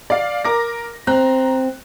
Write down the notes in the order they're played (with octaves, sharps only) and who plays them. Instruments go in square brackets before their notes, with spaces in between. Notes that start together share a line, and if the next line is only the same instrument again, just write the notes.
[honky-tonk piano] D5 F5
A#4 D6 A#6
[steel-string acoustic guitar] C4 [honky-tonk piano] A#5 F#6